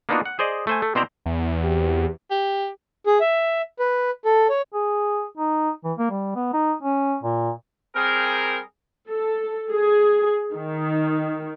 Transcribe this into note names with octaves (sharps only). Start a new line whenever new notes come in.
A#3 B3 D4 D#4 F4 F#4
F#5
G#4 C5 D5 D#5
A3 C5 G#5
A3
B2 C4 E4 C5 D5 A#5
E2
C4 F#4 G4
G4
G#4
E5
B4
A4
C#5
G#4
D#4
E3
A#3
G3
B3
D#4
C#4
A#2
G3 C4 G#4 A#4
A4
G#4
D#3